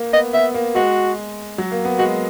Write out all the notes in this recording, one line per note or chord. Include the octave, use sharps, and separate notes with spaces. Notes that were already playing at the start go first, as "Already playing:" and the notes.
Already playing: A#3
B3 D#5
B3 E5
A#3
G#3 F#4
F#3
A#3
B3
G#3 F#4